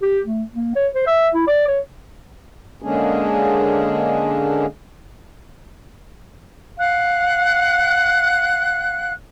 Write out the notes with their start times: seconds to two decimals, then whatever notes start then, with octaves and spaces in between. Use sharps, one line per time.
0.02 G4
0.26 A3
0.54 A#3
0.76 C#5
0.95 C5
1.06 E5
1.34 E4
1.47 D5
1.68 C#5
2.82 D3 G#3 A#3 C#4 D4 G#4
6.79 F5 F#5 F#6